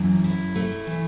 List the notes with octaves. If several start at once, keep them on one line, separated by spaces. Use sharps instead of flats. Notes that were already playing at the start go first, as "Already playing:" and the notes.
Already playing: F#2 E3
E4
A3
E3